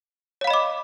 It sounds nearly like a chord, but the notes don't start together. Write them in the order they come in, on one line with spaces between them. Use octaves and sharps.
C#5 F5 B5 D#5 D6